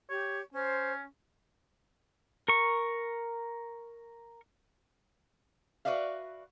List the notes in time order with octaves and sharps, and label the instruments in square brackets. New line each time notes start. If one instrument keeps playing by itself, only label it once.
[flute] G4 [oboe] C#5
[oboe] C#4 [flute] C5
[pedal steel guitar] A#4 C#6
[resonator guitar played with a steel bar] F#4 B4 D5 E5 F5